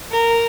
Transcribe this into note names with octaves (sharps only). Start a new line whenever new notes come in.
A#4